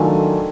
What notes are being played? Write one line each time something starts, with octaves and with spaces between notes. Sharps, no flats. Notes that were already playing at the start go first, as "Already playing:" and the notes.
Already playing: D#3 F#3 A3 D4 F4 G#5